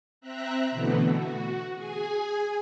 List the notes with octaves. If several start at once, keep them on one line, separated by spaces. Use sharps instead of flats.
C4 E5 A#5 F#6
B2 D3 E3 A3 B3
F#4
G#4 G#5